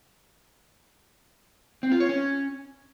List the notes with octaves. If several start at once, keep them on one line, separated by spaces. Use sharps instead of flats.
C4
F4
C#5
C#4